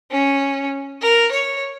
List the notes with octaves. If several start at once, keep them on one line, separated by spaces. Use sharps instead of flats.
C#4
A#4
C#5